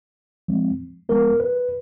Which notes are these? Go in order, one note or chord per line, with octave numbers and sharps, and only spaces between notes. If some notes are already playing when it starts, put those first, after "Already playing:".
F3 G#3 C4
F3 G#3 B3 A#4
B4